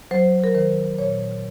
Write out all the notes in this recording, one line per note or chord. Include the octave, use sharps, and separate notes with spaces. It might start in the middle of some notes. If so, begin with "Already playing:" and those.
F#3 C5
A#4
D#3 C5
A#2 C#5